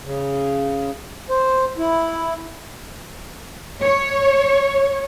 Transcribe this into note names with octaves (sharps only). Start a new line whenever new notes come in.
C#3
C5
E4
C#5